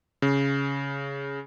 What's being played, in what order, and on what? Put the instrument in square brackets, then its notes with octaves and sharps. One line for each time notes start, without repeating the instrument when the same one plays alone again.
[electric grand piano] C#3